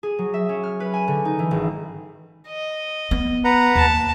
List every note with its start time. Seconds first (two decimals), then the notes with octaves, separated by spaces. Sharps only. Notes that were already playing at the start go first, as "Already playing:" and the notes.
0.03 G#4
0.18 F#3
0.34 E5
0.49 C#4
0.63 F6
0.80 B4
0.94 G#5
1.08 D3
1.25 D#4
1.39 E3
1.51 G#1
2.48 D#5
3.11 B3
3.44 B4 F#5 A#5
3.75 D#2 A5